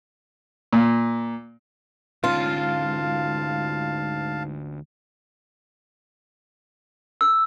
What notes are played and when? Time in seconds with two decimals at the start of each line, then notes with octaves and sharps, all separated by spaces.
0.73 A#2
2.24 D2 G#2 C#4 F4 F5 A5
7.21 E6